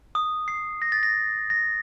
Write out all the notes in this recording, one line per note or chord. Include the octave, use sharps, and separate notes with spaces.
D#6
C7
A#6
A6
A#6
A#6